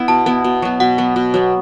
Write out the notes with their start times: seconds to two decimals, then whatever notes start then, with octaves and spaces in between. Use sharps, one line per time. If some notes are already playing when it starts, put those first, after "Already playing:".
Already playing: B3 E4
0.08 B2 A5
0.26 B3 E4
0.44 B2
0.62 F#3 B3
0.80 B2 F#5
0.98 F#3 B3
1.16 B2
1.34 F#3 B3